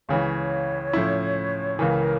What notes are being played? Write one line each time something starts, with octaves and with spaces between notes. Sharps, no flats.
C#2 C#3 E3 C#5
A2 F3 C#4 E4
C#2 C#3 E3 A#4